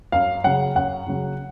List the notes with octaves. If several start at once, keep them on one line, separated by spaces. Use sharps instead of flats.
F#2 F5
C#3 F#3 F#5
F#2 F#5
C#3 F#3